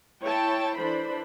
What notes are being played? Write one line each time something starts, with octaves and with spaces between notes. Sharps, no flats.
E4 C#5 G5 A5
E3 D4 A4 C5 B5